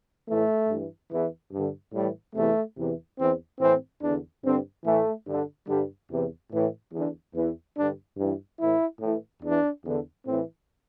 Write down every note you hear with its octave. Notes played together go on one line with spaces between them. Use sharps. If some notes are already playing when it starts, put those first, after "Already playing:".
A2 E3 A3
G2 E3
E2 E3
G2 D3
A2 E3 G3
E2 C3 E3 A3
E2 C3 E3
E2 E3 C4
A2 E3 C4
E2 D3 D4
G2 D3 C4
A2 E3 A3
G2 D3
G2 D3 G3
E2 C3 E3
A2 E3
E2 D3
E2 E3
G2 D3 D4
G2 E3
A2 E3 E4
A2 E3
E2 E3 D4
E2 D3
A2 E3 C4